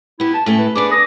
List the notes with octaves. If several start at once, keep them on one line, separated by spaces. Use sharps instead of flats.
B3 E4 G4
A5
A2 A3 C#4 A4
B4
B3 D4 G#4 D6
D#6 A#6